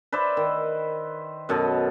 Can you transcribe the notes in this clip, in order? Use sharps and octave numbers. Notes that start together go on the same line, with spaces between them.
B4 C5 D5 E5
D#3
F#2 B2 A4 D#5